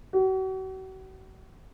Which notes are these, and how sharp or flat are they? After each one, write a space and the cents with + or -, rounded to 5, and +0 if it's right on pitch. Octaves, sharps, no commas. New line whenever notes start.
F#4 +40